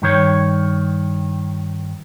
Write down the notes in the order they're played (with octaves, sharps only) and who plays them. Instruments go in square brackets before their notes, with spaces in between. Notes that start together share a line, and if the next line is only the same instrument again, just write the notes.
[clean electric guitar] G2 D#3 C#5